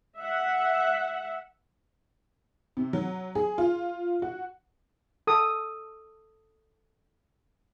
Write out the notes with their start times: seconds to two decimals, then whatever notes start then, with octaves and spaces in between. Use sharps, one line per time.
0.18 E5 F#5
2.77 C3
2.93 F#3
3.35 G#4
3.58 F4
4.22 F#4
5.27 A4 D#6